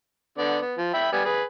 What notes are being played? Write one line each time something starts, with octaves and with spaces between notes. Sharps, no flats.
D3 B3 D5
B3
F3
E5 G5 B5
G3 B3 G#5
G#4 B4